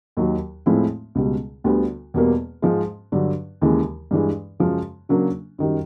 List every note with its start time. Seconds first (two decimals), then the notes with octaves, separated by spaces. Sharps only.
0.17 D#2 D#3 F#3
0.66 A2 F3 G#3 C4 E4
1.15 C#2 B2 G3
1.64 D2 D3 G3 B3
2.14 E2 B2 G3 A#3
2.62 G#2 F3 G#3
3.12 G2 D3 F#3
3.61 D#2 C#3 E3 G#3
4.11 G2 E3 G#3
4.60 F#2 C#3 F3 G#3
5.09 C#3 F#3 A#3 D4
5.58 F#2 D#3 G3